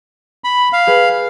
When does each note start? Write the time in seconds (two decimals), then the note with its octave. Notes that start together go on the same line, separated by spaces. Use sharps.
0.44 B5
0.73 F5
0.87 G#4 B4